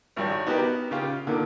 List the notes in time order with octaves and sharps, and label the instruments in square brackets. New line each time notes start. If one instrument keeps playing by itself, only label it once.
[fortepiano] G#1 G3 C#5
B3 D#4 F#4 G4 A#4
C#3 F4 G4
A#2 D3 D#3